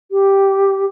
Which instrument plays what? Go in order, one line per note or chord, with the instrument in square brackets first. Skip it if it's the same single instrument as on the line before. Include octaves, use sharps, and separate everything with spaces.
[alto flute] G4